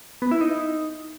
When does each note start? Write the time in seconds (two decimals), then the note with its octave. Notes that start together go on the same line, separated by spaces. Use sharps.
0.22 B3
0.31 E4
0.41 D#4